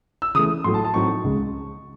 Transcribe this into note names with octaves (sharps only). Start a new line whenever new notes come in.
E6
C#3 E3 A3 D#6
A2 F#3 A3 C6
A5
A5
A2 F#3 C4 D#4 C#6
C#2 C#3 G#3